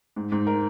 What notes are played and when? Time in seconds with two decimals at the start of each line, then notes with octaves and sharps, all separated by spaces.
0.16 G#2
0.32 G#2
0.47 A#4